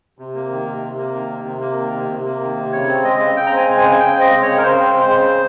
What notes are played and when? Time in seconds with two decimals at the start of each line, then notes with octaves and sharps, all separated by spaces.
0.19 C3
0.35 A#3
0.50 D#3
0.66 C3
0.82 C3
0.98 A#3
1.14 D#3
1.29 C3
1.45 C3
1.61 A#3
1.77 D#3
1.92 C3
2.09 C3
2.25 A#3
2.41 D#3
2.57 C3
2.72 C#3 C#5
2.88 C4
3.04 G#3 D#5
3.20 C#3
3.36 C#3 G5
3.46 A#5
3.52 C4 G#5
3.67 G#3
3.78 G#5
3.83 C#3
3.99 C#3 G5
4.15 C4 D#5
4.32 G#3
4.42 C#3 C#5
4.58 A#4
4.63 C#3 C5
4.79 C4
4.94 G#3
5.10 C#3